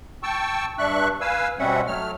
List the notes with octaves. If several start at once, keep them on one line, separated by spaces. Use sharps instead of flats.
G5 A5 C#6 E6
G2 D4 E5 C#6 F#6
B4 F5 G#5 E6
B2 G3 C4 C#4 E5 F#5
F#3 A3 F6